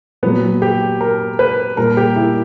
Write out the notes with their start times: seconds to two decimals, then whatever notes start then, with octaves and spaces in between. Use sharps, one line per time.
0.23 A#2 F#3 B3
0.62 G4
1.01 A#4
1.39 B4
1.77 A#2 G3 A#4
1.97 G4
2.16 E4